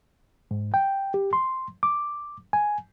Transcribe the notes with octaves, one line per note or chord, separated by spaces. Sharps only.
G#2
G5
G4
C6
D6
G#5